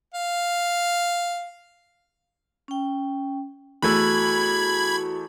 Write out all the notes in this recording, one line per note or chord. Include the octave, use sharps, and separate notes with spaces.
F5
C#4 G5
E2 A3 F#4 B5 E6 G#6